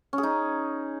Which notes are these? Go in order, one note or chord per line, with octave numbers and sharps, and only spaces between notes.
C#4
G#4
D#4